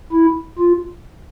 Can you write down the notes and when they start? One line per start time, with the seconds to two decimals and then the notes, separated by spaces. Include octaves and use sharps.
0.12 E4
0.59 F4